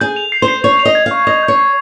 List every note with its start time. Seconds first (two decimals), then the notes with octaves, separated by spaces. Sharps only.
0.01 G#4 G6
0.16 F7
0.32 C7
0.42 C5
0.48 C7
0.64 C#5 F7
0.79 F7
0.85 D#5
0.95 G#6
1.06 F5
1.11 C#6
1.27 D#5 F7
1.43 G6
1.48 C#5
1.59 C7